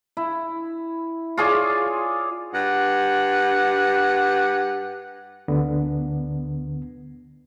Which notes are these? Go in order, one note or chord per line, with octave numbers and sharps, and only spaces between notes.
E4
F4 G#4 C#5 D5
G2 G4 F#5
D2 D3 B3